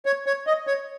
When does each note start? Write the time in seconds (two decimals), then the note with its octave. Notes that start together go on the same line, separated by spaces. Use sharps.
0.06 C#5
0.26 C#5
0.47 D#5
0.67 C#5